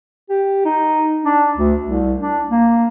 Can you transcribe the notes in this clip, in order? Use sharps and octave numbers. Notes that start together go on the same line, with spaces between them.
G4
D#4
D4
D2
C2
D4
A#3